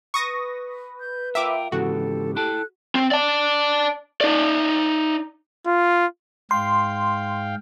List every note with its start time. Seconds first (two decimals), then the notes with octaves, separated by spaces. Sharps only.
0.14 B4 C#6 D#6 A#6
1.00 G6
1.35 F4 A#4 E5 G5 D6
1.72 G#2 C#3 E3 F#4 G4 A4
2.36 E4 A4 G5 A5 F#6
2.95 C4
3.11 D5 A5
4.21 D#4 D5
5.66 F4
6.51 G#2 F5 G5 C6